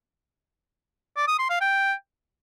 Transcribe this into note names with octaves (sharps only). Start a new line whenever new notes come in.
D5
D#6
C6
F5
G5